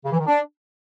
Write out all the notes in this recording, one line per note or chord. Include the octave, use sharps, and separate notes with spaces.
C#3
E3
D#3
D4